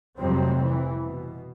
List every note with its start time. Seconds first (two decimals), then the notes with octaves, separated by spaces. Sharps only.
0.18 F1 F2 C3 F#3 G3 C4
0.61 E3
0.99 B2